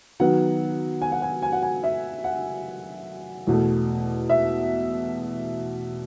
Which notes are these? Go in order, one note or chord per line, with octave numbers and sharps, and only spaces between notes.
D#3 F#3 B3 F#5
G#5
F#5
G#5
G#5
F#5
G#5
E5
F#5
E2 B2 A3
E5